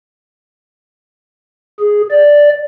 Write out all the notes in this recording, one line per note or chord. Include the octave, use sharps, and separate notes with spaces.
G#4
D5